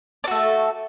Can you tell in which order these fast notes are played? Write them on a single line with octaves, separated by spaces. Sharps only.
D4 F#4 A3 A4